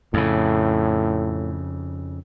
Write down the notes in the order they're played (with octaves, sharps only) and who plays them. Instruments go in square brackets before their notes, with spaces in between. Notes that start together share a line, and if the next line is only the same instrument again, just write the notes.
[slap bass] F2 C#3 [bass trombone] A2